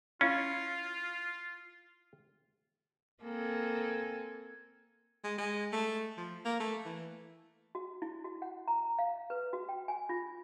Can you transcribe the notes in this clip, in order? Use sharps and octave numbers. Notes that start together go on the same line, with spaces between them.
C#4 E4 F4 F5 B5
A#3 C4 A4 G#5
G#3
G#3
A3
F3
A#3
A3
E3
F#4
E4
F#4
F#5
A#5
F5
B4
F#4
G5
G#5
F4